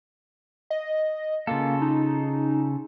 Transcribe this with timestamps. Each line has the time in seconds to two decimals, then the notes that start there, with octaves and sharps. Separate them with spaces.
0.70 D#5
1.47 C#3 A#3 F4 A4
1.82 D#4